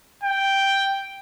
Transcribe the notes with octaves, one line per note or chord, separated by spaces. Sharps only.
G5